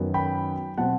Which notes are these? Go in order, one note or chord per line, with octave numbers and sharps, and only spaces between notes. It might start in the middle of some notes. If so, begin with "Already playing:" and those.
Already playing: F#2 D#3 F#3 B3
G5 B5
B2 F#3 C4 F#5 A5